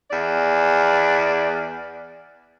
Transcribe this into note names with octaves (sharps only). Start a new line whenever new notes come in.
E2 D5